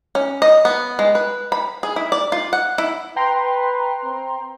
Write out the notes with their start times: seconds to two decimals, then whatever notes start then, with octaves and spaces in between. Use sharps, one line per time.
0.15 C#4
0.42 D#5
0.65 B3
0.99 G#3
1.15 B4
1.52 B5
1.83 G#4
1.96 E4
2.12 D5
2.32 F4
2.53 F#5
2.78 E4
3.16 B4 G5 A#5 C6
4.03 C4